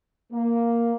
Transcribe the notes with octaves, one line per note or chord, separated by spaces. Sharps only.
A#3